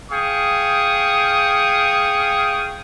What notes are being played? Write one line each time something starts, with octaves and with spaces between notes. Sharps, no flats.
G#4 F5 G5 C#6 D#6